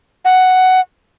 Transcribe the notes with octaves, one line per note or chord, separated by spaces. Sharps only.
F#5